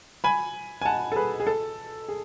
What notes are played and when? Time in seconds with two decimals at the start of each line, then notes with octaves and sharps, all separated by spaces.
0.24 G#5 B5
0.81 G#5
0.85 F#5 A5
1.12 A4
1.16 G#4 B4
1.40 G#4
1.47 A4
2.09 G#4